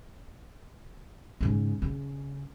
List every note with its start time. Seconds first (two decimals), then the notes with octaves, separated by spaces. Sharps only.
1.41 G#2 C#3
1.82 C#3